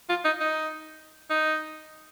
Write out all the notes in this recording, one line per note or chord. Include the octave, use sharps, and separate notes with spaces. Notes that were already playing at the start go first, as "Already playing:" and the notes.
F4
D#4
D#4
D#4